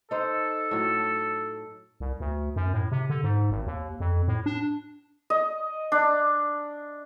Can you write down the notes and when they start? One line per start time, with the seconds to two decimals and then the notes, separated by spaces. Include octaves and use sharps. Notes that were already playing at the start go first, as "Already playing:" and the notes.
0.11 D#4 A4 C5
0.71 A2 F#3
2.00 C2
2.20 D2
2.56 F#2
2.73 A2
2.92 C3
3.10 D3
3.24 G#2
3.51 G#1
3.67 D#2
4.00 F2
4.28 A2
4.46 D4
5.30 D#5
5.92 D4